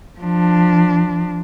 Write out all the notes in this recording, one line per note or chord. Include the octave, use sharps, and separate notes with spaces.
F3 D4